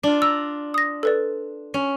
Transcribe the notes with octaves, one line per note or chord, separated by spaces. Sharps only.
D4 F4
A#5 E6
D#6 A#6
A4 B4 D5
C#4